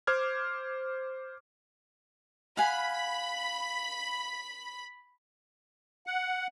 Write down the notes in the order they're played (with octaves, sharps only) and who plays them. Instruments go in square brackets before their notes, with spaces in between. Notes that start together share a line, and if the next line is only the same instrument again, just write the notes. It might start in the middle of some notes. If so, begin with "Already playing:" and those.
[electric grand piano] C5 D6 F6 G#6
[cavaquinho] F5 F#5 G#5 [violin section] B5
[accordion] F#5